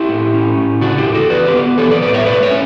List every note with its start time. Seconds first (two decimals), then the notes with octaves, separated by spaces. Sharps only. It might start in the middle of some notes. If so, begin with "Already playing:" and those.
Already playing: E4 G4
0.09 A2
0.34 C#4
0.57 A2
0.81 C#3 D4 F#4
0.97 E4 G4
1.06 E2
1.14 F#4 A4
1.30 E3 B4 D5
1.46 G4 B4
1.54 B3
1.78 E3 A4 C#5
1.91 B4 D5
2.02 A2 B4 D5
2.14 C#5 E5
2.26 A3 B4 D5
2.43 C#5 E5
2.51 C#4